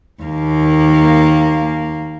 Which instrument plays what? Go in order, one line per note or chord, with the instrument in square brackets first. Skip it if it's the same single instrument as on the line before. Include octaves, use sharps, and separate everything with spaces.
[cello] D#2 A#3